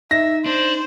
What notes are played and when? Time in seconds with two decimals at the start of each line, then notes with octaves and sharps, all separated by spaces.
0.11 D#4 E5 A#6
0.46 D4 C5